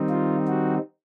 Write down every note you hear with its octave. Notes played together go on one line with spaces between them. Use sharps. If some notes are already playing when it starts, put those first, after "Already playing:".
Already playing: D#3 G3 C4 D#4
F4
F#4